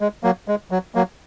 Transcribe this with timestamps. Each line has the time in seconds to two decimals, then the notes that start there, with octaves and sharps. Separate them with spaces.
0.01 G#3
0.24 F#3 A#3
0.48 G#3
0.71 F#3
0.95 F#3 A#3